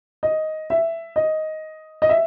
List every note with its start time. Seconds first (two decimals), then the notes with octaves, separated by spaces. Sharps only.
0.23 D#5
0.70 E5
1.16 D#5
2.02 D#5
2.09 E5